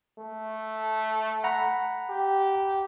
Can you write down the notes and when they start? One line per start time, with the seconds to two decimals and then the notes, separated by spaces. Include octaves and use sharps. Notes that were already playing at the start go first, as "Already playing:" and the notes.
0.19 A3
1.44 F#5 A#5 B5
2.10 G4